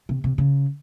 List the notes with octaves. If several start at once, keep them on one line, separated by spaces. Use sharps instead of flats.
C3
C3
C#3